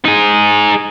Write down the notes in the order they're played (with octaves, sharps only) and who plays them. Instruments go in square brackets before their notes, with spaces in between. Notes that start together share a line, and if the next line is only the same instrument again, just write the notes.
[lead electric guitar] D#4 G#4